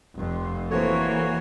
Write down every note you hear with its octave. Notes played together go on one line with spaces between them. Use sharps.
F1 F2
E3 A#3 F#4 A4 C5 C#5